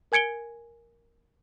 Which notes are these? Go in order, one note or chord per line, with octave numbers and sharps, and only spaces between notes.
A#4 G#5 G#6 C#7 D7 G7